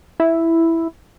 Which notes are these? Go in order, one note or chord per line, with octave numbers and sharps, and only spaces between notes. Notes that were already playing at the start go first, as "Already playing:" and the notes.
E4